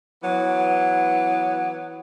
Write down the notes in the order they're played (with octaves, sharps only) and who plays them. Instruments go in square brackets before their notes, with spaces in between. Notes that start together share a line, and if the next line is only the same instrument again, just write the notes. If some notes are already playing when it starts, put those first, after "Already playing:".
[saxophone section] E3 F#3 B3